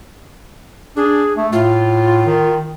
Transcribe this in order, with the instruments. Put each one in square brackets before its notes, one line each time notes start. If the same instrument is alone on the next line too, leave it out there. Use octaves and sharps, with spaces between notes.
[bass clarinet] D4 [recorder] G#4
[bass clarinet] A3
[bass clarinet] A2 [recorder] F4
[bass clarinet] D#3